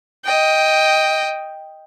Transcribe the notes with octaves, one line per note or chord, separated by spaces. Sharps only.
D#5 G5